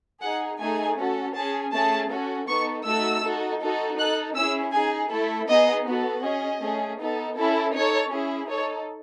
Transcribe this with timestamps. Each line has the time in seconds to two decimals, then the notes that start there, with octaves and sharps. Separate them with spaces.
0.22 D#4 G#4 F#5
0.60 A3 D#4 G#4 G#5
0.97 C#4 F#4 A4
1.35 C#4 G#4 A5
1.72 A3 C#4 G#4 A5
2.09 C#4 F#4 A4
2.47 B3 D#4 A4 C#6
2.85 A3 D#4 F#4 A4 E6
3.23 D#4 F#4 A4
3.61 D#4 F#4 A4
3.98 D#4 A4 F#6
4.35 C#4 E4 G#4 E6
4.72 D#4 G#4 G#5
5.10 A3 E4 A4
5.48 B3 D#4 G#4 D#5
5.86 B3 F#4 A4
6.23 C#4 G#4 D#5
6.60 A3 C#4 G#4
6.98 B3 D#4 A4
7.36 C#4 E4 A4
7.73 D#4 A4 C#5
8.11 C#4 E4 G#4
8.48 D#4 A4 C#5